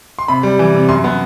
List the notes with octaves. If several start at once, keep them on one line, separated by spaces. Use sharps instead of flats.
C6
C3 B5
G3
E3
C3
F#2 C6
B3